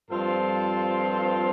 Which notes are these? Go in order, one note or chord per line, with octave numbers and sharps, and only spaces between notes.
G2 F3 C4 F4 A4